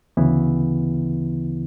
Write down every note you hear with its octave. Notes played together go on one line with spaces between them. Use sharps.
D2 C#3 E3 B3 E4